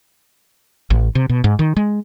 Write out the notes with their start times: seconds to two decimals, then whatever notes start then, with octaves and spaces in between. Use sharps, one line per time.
0.90 A1
1.15 C3
1.30 B2
1.44 G#2
1.59 D#3
1.77 G#3